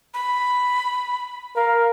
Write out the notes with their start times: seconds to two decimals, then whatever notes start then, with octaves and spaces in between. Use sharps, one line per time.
0.14 B5
1.56 A#4 F5